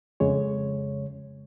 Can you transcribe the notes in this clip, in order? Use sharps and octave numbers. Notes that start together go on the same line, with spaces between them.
F2 C#3 G#3 C#5